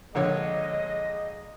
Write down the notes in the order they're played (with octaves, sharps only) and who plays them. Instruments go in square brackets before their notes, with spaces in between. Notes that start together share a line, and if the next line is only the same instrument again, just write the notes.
[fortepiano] A#1 D3 C#5 [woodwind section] G#3 D#5